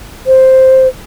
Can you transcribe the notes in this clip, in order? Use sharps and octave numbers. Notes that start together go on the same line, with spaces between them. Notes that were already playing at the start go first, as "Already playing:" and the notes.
C5